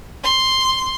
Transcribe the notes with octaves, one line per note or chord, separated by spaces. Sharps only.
C6